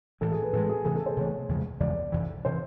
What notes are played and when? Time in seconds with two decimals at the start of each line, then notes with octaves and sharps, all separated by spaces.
0.21 A2 E3 G#3 A4
0.32 G#4
0.42 B4
0.53 A2 E3 G#3 A4
0.69 G#4
0.85 C3 E3 A3 G#4
0.95 A4
1.06 C5
1.17 C3 E3 A3 C#5
1.49 E2 C#3 F3 G#3
1.80 E2 C#3 F3 G#3 D5
2.12 F2 C3 E3
2.45 C3 E3 C5